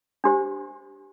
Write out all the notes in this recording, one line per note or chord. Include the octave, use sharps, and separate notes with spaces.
D4 G4 C5